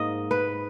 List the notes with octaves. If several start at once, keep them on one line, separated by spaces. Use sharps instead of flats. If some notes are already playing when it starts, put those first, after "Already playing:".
Already playing: G#2 A#3 D#5
B4